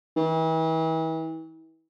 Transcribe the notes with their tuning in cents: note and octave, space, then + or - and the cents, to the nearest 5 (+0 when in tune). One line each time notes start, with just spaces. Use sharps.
E3 -40